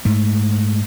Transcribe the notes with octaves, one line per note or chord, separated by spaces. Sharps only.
G#2 A3